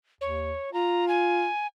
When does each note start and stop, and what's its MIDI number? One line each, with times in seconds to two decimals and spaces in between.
0.21 0.54 39
0.21 0.72 73
0.73 1.48 65
0.73 1.07 82
1.08 1.67 80